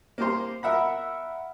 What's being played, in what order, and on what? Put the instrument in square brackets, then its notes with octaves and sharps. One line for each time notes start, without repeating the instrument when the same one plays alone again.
[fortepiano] A#3 G4 C5
A#4 E5 F#5 B5